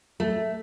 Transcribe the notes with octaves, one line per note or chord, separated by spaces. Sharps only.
A3